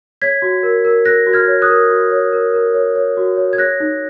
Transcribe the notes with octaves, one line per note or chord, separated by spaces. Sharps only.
C#5 G#6 B6
F#4
A#4
A#4
A#4 F#6 A#6
F#4
F6 G#6
C#5
D#6 F#6
A#4
F#4
C#5
A#4
A#4
C#5
C#5
F#4
C#5
G#6
C#5 F#6 A#6
D#4